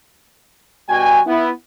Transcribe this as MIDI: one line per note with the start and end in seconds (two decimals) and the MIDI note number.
0.89 1.19 47
0.89 1.19 55
0.89 1.19 66
0.89 1.19 79
0.89 1.19 80
1.27 1.50 59
1.27 1.50 64